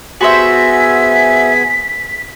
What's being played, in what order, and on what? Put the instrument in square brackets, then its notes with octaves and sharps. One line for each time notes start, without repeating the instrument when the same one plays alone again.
[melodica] B3 G#4 G#5 [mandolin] F#4 C5 E5 [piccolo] B6